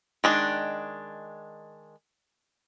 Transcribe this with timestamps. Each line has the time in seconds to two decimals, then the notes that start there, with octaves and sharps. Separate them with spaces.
0.24 D#3 G#3 D4